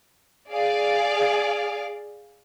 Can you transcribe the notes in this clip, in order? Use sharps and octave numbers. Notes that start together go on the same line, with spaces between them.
G#4 D5 F5